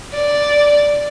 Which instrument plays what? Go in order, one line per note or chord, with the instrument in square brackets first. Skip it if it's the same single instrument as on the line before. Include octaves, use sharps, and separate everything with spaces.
[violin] D5